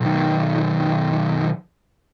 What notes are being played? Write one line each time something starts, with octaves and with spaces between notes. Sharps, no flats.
B1 D#3